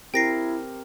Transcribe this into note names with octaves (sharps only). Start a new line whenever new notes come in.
C4 E4 G4 A#4 G5 A#6 C7